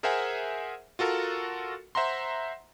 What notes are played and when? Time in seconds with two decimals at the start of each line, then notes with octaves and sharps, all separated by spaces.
0.03 G#4 A#4 C5 E5 F#5 G#5
0.99 F4 F#4 A4 A#4
1.95 C5 E5 F#5 A#5 C6